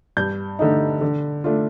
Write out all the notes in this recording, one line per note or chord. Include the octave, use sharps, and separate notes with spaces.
G2 G6
D3 A3 D#4
D3
A3 D4 F4